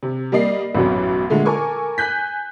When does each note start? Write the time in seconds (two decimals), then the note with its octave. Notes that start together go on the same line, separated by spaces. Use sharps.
0.03 C3
0.32 G3 A#3 D5 D#5 C7
0.75 A1 F#2 B2
1.30 A#2 D3 G#3 A3
1.45 A4 A#4 G#5 C#6 D6
1.98 G#5 F#6 G6 B6